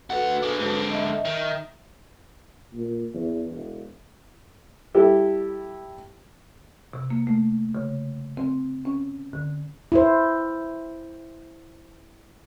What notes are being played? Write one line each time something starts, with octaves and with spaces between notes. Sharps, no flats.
D2 F#4 A4 B4 F#5
D4 G#4
G#2 D3
D#5 E5
D#3
A#2
E2
E1
G3 E4 G4 A4
C3
A#3
A3
C#3
C4
C#4
D3
E4 C5